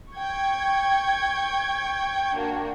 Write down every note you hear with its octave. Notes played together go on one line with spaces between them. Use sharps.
G5 C#6 G#6
A#3 D4 F#4